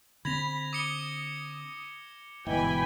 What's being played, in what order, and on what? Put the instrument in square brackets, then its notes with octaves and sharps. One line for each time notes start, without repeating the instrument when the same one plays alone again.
[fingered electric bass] D3 C4 [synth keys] B5 [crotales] G#6 A#6 F7
[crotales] D6 C#7 G7 [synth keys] D#6
[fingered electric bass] G1 G#2 [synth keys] B2 E3 [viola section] G5 G#5 B5